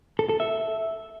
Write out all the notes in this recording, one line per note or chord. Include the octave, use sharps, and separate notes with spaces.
A4
A4
E5